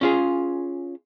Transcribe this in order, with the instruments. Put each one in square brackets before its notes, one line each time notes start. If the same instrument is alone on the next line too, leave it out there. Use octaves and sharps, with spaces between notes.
[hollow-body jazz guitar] C#4 F4 G#4